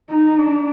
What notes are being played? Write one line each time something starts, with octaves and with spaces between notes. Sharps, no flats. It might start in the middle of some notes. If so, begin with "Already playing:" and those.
D#4
D4